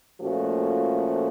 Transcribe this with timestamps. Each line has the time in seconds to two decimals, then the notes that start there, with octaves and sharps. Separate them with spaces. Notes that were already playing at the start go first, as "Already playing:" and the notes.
0.20 A#2 F3 A3 C#4 F#4